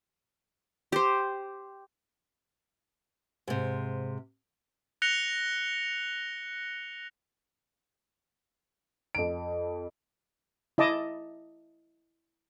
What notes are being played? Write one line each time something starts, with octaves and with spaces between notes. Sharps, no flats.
G4 C5
G#2 C3
F#6 A#6 C#7 F7 G7
F2 D7
E4 D#5 A5 D6